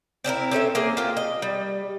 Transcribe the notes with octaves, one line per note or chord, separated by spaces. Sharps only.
C4 D4 E4 A#4
C4 C#4 A4 E5
A#3 G#4
F4 G4
D#5
G3